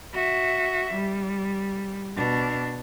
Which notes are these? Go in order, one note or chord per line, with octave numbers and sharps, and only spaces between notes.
F#4 E5
G3
B2 D4